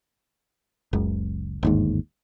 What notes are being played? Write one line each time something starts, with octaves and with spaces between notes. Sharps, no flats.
F#1 C#2
G1 D#2 G#2